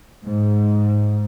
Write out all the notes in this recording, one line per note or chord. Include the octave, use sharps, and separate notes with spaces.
G#2